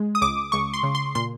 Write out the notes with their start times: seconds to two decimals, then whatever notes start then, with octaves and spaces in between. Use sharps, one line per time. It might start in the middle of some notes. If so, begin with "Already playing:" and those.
Already playing: G#3
0.15 D#6
0.21 C#2 D6
0.52 C#2 C#6
0.74 C6
0.83 C#3
0.95 C6
1.15 A#2 C6